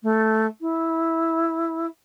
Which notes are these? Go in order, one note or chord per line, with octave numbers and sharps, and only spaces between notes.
A3
E4